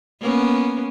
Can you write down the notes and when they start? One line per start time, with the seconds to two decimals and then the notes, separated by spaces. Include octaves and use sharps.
0.21 A#3 B3 C#4